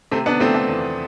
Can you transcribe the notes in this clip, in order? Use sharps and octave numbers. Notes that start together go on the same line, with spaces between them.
C3 A3 C4
B3 D4
F3 A3 C4
A3
E2